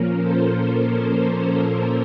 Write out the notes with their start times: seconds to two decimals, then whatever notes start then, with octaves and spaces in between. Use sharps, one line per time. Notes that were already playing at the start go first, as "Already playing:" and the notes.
Already playing: A#2 F3 A#3 C#4 A#4
0.16 A4 C5
0.71 A#4
1.25 A4